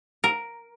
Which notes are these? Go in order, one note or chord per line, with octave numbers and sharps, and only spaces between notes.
A#4